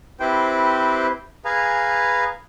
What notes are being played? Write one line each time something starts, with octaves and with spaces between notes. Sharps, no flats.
C4 E4 G4 B4 C5 G5
G#4 B4 F5 G#5 A#5